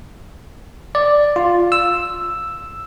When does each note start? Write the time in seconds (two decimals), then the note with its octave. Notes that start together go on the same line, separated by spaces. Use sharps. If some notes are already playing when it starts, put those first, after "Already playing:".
0.95 D5
1.36 F4
1.72 E6